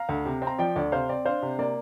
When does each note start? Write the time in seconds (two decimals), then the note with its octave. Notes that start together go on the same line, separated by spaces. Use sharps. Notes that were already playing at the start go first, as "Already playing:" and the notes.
Already playing: F5 A#5
0.09 D2
0.26 C3
0.42 C4
0.47 A#5
0.58 F3 D5 G5
0.76 D2 D5
0.92 C3 C5 F5
1.09 C4 D5
1.25 D4 C5 F5
1.42 C3
1.59 A#3 D5